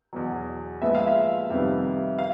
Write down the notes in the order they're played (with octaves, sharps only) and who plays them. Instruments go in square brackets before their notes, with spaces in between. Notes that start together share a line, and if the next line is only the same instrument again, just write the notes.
[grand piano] E2 B2 F#3
[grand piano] A#2 F3 G#3 B3 [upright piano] E5
[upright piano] F5
E5
[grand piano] F2 C3 D#3 G3 B3
[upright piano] F5